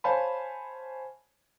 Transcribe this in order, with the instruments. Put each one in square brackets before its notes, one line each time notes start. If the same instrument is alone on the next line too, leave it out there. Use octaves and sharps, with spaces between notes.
[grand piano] C5 C#5 F5 G#5 A5 B5